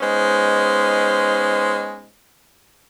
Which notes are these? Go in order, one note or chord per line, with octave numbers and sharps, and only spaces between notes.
G#3 B3 C#4 D#4 C5